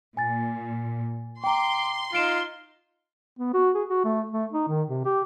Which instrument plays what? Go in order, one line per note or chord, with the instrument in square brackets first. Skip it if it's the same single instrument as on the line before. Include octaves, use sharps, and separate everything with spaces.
[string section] A#2 [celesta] G#5 A6
[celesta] G5 A#5 [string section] C6 [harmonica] D6
[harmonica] D#4 F4 [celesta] C7 D7 E7
[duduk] B3
F#4
G#4
F#4
A3
A3
D#4
D#3
C3
G4